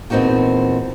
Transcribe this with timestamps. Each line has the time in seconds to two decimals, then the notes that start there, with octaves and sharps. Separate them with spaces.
0.10 E2 A#2 C4 D#4 F#4 G5